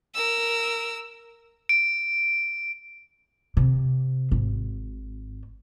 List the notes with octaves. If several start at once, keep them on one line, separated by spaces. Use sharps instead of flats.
A#4 E6
D7
C3
G#1